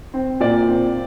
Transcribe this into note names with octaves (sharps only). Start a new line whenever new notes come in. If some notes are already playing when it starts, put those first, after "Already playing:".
C4
A#2 D5
C4